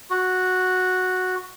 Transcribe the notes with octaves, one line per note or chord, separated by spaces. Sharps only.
F#4